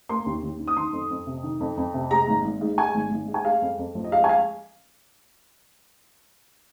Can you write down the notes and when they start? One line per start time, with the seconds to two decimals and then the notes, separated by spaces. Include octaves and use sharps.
0.09 A#3 C6
0.26 D#2
0.43 D#2
0.59 D#3
0.68 D#6
0.77 D#3 C6
0.93 F2
1.10 F2
1.27 C3
1.43 D#3
1.60 F2
1.77 F2
1.94 C3
2.11 G#3 A#5
2.28 G#1
2.45 G#1
2.61 G#2
2.78 G#3 G#5
2.95 G#1
3.11 G#1
3.28 G#2
3.34 G#5
3.45 G#3 F5
3.62 F2
3.79 F2
3.95 F3
4.04 D#5
4.12 G#3 F5
4.24 G#5
4.29 F5